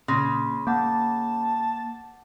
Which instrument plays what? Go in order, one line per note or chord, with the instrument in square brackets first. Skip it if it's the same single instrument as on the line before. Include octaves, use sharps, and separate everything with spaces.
[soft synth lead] A#2 [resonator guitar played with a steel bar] C#3 [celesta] C6 A#6
[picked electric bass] A#3 [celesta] F#5 D6 G6 [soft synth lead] A5